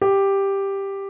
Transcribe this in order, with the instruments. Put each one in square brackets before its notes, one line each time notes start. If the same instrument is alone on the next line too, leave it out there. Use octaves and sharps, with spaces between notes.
[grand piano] G4